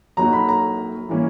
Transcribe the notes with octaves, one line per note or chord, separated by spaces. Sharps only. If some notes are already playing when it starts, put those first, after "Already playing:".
F#3 A#3 D#4 F#4 A#5
B5
A#5
E3 G3 A#3 C#4